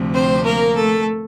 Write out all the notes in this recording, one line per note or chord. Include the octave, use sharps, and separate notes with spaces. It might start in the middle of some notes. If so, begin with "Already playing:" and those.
Already playing: D2 C3 F3 A3
C4 C5
A#3 A#4
A3 A4